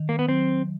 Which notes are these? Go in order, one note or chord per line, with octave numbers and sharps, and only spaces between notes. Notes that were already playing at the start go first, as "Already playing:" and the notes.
Already playing: D#3
A#3
B3
F#3 C4